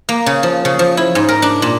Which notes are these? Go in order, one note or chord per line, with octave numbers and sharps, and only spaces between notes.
A#3
C#3
F3
C#3
F3
E4
G#2
A#4
D4
A#2